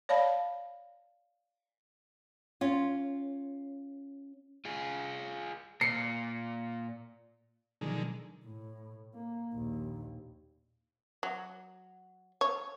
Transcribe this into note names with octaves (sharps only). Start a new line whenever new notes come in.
C#5 D5 F5 A5 B5
C#4 F4
F4 G#4
A#2 C7 C#7
B2 D3 D#3 F3 F#3 G#3
A2
A#3
A#1 D#2
F#3
C#5